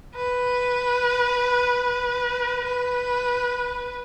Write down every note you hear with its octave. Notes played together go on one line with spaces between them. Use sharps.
B4
B4